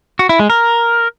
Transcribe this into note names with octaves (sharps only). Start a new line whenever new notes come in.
F#4
E4
G#3
A#4